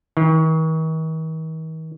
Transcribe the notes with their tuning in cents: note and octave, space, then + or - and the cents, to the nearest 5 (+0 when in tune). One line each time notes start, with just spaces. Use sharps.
D#3 +45